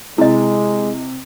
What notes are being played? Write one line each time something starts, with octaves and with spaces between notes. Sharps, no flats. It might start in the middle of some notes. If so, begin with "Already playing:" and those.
C3 G#3 E4 D#5